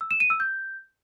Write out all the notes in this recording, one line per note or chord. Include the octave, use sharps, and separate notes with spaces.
E6
E7
D#7
E6
G6